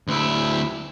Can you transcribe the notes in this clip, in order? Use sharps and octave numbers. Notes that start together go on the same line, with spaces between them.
D2 E4